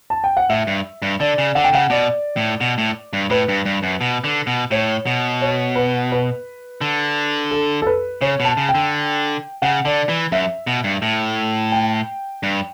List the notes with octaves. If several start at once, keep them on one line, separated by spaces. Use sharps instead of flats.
A5
G5
F#5
A2 E5
G2
G2
D3 D5
C#3
D3 F#5
G5
C#3 F#5
B2 D5
A2
B2
A2
G2
A2 B4
G2
G2
F#2
B2
D3
B2
A2 C#5
B2
C#5
B4
B4
D3
A4
A4
B4
C#3 C#5
B2
A5
C#3
G5
D3
C#3 F#5
D3 D5
E3
F#2 E5
B2
G2
A2
G5
G2